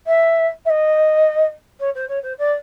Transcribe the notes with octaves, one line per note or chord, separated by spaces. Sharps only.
E5
E5
D#5
C#5
C5
C#5
C5
D5